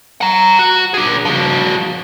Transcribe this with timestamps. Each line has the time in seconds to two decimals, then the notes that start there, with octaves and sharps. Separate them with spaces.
0.21 F#5 A#5
0.59 F#4
0.94 D4 G#4
1.25 F3 F#4